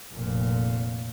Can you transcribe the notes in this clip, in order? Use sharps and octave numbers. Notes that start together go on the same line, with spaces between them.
F1 A#2